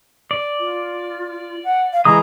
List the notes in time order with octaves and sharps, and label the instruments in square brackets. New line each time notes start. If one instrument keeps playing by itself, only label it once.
[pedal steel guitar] D5
[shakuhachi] F4
F#5
F5
[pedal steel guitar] E3 G#3 D#6 [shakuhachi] A#5